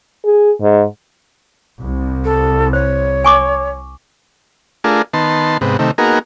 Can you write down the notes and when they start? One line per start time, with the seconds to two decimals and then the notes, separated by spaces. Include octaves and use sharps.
0.25 G#4
0.61 G#2
1.80 C2
2.24 A4
2.73 C5 C#5
3.24 G#5 C#6 D6
4.84 A3 D4 F4 G#4 A#4
5.13 D#3 B3 A5 C6
5.61 G#2 C3 B3
5.79 C3 D#3 A3
5.98 A#3 B3 D#4 F#4 G#4 A#4